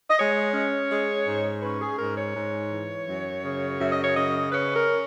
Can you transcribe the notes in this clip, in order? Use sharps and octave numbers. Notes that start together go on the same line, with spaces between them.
D#5
G#3 C#5
C#4
G#3
G#2
C#4 B4
G#4
G#2 A#4
C#5
G#2
E3
F#2
C#3
F#2 E5
D#5
C#5
C#3 D#5
C#4 B4
A#4